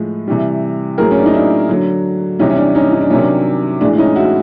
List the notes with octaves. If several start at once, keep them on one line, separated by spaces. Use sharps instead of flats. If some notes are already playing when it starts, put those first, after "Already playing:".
Already playing: A2 F3 G#3
C3 E3 G3
A2 F#3 G#4 A#4
C#4
D4
D#4
D4 E4
D3 F#3
C3 E3 G3 C#4 D#4
C#4
D4
C#4 D#4
D#4
D4
C3 D#3 F#3 C#4
D4
A2 E3 G#3 D4
C#4 D#4
E4 F#4